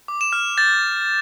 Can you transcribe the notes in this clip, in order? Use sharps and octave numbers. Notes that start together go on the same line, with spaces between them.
D6
E7
F6
G6 A6